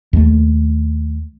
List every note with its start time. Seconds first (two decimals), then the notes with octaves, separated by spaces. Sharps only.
0.13 D#2 A3